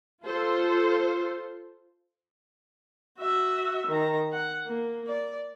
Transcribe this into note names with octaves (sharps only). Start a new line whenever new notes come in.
F4 A4 C5
F#4 E5
D#3 A#5
F#5
A#3
D5